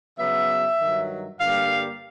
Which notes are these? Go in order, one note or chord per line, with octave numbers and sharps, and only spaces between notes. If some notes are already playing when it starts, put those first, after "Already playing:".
C#3 F#3 B3 E5
G2 D#3 F#3
G2 D3 G3 A#3 F5